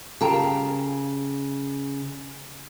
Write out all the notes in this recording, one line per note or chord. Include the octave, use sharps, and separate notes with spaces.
C#3 F4 G4 A4 A#4